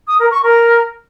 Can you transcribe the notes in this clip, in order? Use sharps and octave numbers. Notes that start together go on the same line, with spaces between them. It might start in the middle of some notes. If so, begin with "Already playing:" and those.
D#6
A#4
C#6
A#4